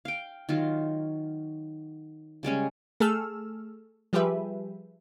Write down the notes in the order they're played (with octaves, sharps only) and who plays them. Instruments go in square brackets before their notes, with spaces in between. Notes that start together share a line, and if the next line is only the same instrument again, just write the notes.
[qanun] F5 G5
D#3 F#3 F4
C#3 G3 G#3 C#4
[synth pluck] A3 G#4 A4 E6 F6
F3 G3 G4 G#4 B4 E5